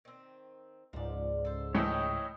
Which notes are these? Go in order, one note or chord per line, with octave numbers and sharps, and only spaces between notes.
D#3 C4
C#2 G#2 F3 D5
A4 C5
A2 E3 E4 C#5 D#5 G5